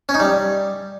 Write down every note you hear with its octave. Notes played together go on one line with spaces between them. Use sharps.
C#4
D#4
G3